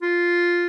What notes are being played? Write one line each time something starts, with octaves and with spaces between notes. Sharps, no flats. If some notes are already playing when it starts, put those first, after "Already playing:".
F4